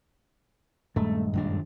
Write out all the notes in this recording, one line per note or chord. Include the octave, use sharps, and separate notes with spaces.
D#1 G2 G#3 A3
F#2 D#3 D4